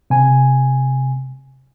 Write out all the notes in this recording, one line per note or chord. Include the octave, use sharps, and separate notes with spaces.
C3 G#5